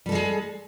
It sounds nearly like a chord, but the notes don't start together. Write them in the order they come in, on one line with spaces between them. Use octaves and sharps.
G3 A4 G#3 G#4